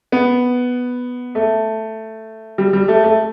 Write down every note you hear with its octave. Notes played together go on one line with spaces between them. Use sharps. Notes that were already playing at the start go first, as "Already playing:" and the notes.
B3
A3
G3
G3
A3
A3